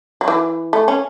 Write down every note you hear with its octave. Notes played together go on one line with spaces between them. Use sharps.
F#3
E3
A3
C#4